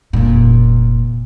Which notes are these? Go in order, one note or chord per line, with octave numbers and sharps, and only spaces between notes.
F1 A#2